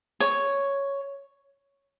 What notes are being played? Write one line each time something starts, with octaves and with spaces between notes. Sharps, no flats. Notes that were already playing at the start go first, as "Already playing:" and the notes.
C#5